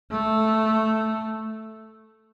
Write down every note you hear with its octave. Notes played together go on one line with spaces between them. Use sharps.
A3